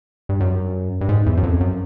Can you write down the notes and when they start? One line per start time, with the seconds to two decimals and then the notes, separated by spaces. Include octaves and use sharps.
0.29 G2
0.40 F#2
1.01 G2
1.09 G#2
1.26 E2
1.37 F#2
1.43 F2
1.61 F#2